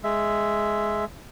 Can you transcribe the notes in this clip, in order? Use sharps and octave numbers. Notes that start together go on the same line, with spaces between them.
G#3 E5